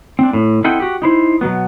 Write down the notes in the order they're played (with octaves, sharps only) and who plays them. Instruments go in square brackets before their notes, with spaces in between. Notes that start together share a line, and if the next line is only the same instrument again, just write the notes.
[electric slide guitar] C4 D4
A2
C4 E4 A4 D#5 F#5 G5
F#4 G4
D#4 E4 C5
B2 F#3 B3